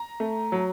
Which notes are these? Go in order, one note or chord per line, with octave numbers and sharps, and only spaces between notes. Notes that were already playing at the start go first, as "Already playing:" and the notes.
Already playing: A#5
A3
F#3